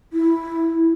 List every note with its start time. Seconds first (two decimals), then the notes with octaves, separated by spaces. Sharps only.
0.13 E4